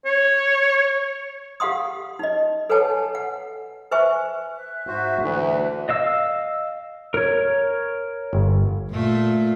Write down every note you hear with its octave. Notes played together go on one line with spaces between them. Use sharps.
C#5
G4 F5 F#5 C6 D#6
D#4 D#5
A4 B4 C#5 F#5 G#5 A5
F#5
B4 C5 E5 G#5 C#6
E5 F#6
G#2 F#4 C5
D2 E3
D#5 F5 E6
A#4 C#5
G1
A#2 A3 F4